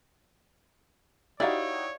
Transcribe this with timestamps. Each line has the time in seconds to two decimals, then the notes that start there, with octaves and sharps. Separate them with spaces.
1.40 D#4 E4 F#4 G4 C#5 D5 F5